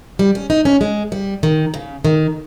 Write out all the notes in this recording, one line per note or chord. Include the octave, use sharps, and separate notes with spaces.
G3
C#4
D#4
C#4
G#3
G3
D#3
C#3
D#3